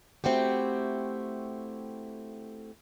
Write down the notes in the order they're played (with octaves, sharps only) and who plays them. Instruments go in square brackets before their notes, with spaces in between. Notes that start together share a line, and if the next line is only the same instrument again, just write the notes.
[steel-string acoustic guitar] A3 C4 E4 F#4 G4